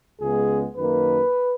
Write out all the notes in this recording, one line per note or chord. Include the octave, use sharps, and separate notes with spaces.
C#2 C#3 G#3 B3 G#4
F#2 D#3 A#3 B4